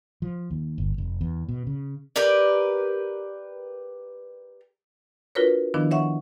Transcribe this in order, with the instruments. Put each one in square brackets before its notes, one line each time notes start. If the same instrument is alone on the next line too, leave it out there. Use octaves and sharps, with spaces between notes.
[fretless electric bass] F3
D#2
G1
F1
E2
B2
C#3
[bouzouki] G4 A#4 B4 D5
[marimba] D4 F4 F#4 A#4 B4 C#5
D#3 F3 B3 D4 E4
C#5 E5 F#5 C#6